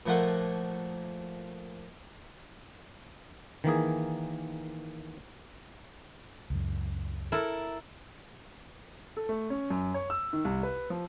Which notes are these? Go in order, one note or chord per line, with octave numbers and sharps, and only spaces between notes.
A#2 F3 A3 A#3 F#5
D#3 E3 A#3 G#4
C#2 F#2
E4 A4 A#4
A4
A3
C#4
F#2
C#5
E6
D#3
C2
B4
F3